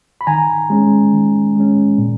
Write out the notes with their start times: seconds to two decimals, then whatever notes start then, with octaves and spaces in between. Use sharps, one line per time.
0.21 B5
0.27 D#3 G#5 A#5
0.70 G#3 C#4
1.13 D#3
1.55 G#3 C#4
1.98 A#2